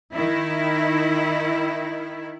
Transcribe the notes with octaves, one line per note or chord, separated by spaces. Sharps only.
D#3 E4